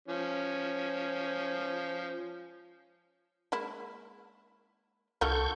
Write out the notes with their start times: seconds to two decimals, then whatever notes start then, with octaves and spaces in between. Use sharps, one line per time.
0.08 F3 C#4
3.52 G#3 A#3 E4
5.21 C2 D3 F4 F#4 A4 A#4 C#6 G6